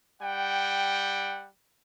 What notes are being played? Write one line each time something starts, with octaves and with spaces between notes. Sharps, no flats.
G3 F#5 G5